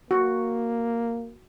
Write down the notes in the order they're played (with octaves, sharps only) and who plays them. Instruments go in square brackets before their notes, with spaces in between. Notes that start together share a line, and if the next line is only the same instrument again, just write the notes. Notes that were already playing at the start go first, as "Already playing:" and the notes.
[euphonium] A#3 [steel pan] F#4